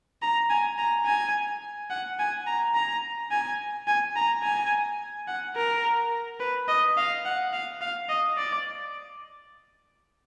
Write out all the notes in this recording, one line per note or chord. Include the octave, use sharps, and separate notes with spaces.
A#5
G#5
A#5
G#5
F#5
G#5
A#5
A#5
G#5
G#5
A#5
G#5
F#5
A#4
B4
D#5
F5
F#5
F5
F5
D#5
D5